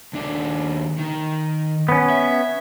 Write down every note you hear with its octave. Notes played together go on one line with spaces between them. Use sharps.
D#2 D4
D#3
B3 C#4
E5